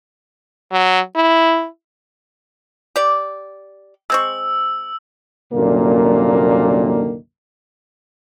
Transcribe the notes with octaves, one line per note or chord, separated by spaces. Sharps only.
F#3
E4
G4 D5
G#3 C4 C#6 E6
C2 F#2 A#2 D3 D#3 A#3